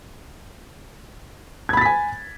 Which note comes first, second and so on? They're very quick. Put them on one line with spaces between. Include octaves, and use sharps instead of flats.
G#6 B5 A6 B6 G#5